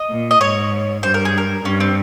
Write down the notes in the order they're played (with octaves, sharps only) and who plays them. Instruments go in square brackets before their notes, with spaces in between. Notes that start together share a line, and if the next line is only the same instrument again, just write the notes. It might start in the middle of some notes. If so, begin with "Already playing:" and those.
Already playing: [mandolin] D#5
[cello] A#2
[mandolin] D#5
[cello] G#2 [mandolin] C#5
[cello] G2 [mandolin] C5
[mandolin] A#4
G#4
A#4
[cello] G2 [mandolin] C#4
[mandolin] C4